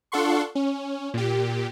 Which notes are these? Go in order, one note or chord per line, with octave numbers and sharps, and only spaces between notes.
D4 F4 A4 F#5 C6 C#6
C#4
A#2 G4